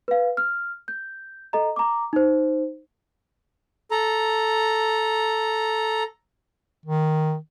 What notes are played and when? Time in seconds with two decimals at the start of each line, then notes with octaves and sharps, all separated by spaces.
0.08 B4 F5
0.37 F6
0.88 G6
1.53 A4 D#5 A#5
1.76 A#5 D6
2.13 D#4 C5
3.91 A4 A#5
6.86 D#3